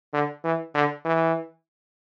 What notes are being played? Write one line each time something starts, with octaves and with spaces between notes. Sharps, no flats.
D3
E3
D3
E3